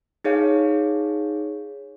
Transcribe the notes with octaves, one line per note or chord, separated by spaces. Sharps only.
D#4 G#4 C#5 F5